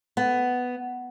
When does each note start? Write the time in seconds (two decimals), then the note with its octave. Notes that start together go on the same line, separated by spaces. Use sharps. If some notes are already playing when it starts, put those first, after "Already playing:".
0.17 B3